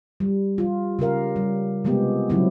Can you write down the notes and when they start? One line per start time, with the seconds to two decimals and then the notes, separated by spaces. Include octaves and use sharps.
0.20 G3
0.58 F3 F4
0.99 C#3 G4 A#4 F5
1.36 G3
1.85 C3 F3 G#3 B3 G4
2.30 C#3 F3 F#3 G#3 C4 E4